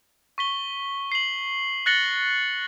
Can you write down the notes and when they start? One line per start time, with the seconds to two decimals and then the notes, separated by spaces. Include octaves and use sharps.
0.38 C#6 B6 G7
1.12 C7 F#7
1.86 F#6 A6 A#6 C#7 F#7 G7